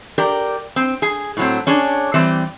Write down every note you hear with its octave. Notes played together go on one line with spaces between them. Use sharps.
G4 A#4 D5
C4
G#4
A2 F#3 C4
C#4 D4 G#4
E3 G3 C4